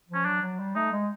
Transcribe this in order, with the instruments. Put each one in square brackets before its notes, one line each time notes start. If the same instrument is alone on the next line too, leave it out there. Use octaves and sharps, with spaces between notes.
[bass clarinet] F3
[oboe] C#4
[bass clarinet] F#3 [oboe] D4
[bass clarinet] F#3
G3
[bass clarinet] A3 [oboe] D#4
[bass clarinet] G#3